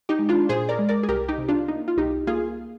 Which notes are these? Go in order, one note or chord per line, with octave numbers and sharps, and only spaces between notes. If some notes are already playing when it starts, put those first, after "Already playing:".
D#4 G4
G#3
D4 F4
A#2 G#4 C5
A#4 D5
G#3
A#4 D5
G#4
C2 G4 A#4
D#4 G4
C3
D4 F4
A#3 D#4
F4
C2 D#4 G4
A#3 F4 G#4